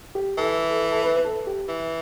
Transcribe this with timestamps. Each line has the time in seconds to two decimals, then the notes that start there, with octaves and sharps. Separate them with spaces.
0.15 G4
0.37 E3 A4
0.70 A4
0.92 A4
1.03 B4
1.17 B4
1.25 A4
1.47 G4
1.68 E3